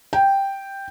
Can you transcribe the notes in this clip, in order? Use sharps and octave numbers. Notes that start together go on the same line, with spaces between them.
G5